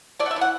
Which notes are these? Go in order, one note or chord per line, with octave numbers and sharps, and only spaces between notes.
A3 D5
F#5
E5
E3
F#5